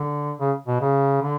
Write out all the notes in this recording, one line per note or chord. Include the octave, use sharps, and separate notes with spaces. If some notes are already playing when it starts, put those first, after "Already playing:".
Already playing: D3
C#3
B2
C#3
D3